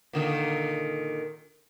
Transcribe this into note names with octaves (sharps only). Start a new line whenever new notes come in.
A#2 D3 D#3